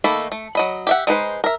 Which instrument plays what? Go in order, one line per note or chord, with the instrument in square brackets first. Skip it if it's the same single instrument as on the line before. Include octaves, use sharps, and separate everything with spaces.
[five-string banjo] D#3 A3 A#3 A4 B5
A3
F#3 D#5 B5
G4 E5 F#5
G#3 D#4 B4 C5
A#4 E5